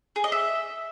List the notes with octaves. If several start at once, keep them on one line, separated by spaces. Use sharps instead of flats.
G#4
D#5
E5